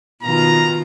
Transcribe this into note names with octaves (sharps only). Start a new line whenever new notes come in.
B2 D#3 F4 A#5